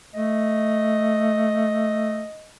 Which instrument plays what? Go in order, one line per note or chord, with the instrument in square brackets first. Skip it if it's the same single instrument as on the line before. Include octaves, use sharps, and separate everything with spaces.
[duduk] A3 [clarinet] D#5